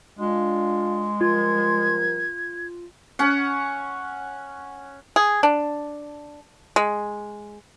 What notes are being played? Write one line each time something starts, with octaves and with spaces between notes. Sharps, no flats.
G#3 D4 F4
F3 G3 F4 A#4 G#6
C#4 F#5
G#4
D4
G#3